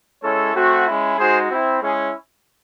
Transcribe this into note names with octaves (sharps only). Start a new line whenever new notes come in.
G#3 C#4 E4 A4 C#5
A3 C4 F#4
G#3 C#4 E4
G#3 D#4 F#4 G#4 C5
C4 E4
G#3 C#4 E4 G#4